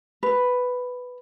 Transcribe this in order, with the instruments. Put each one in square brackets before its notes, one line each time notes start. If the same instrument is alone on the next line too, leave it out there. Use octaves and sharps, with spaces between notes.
[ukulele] B4